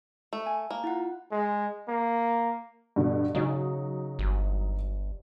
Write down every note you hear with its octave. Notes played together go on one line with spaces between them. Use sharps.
A3
G#5
A#3
E4 F4 F#5
G#3
A#3
G2 B2 D3
C#3 F#3 D#4
G1